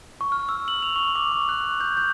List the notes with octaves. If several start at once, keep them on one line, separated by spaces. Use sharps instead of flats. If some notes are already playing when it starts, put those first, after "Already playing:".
C#6
F6
E6
F#7
F7
C#6
D6
C#6
F#6
G6
G6